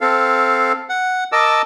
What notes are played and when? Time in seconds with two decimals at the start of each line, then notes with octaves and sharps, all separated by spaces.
0.01 C4 A4 F5
0.89 F#5
1.32 A#4 D#5 A5 D6 E6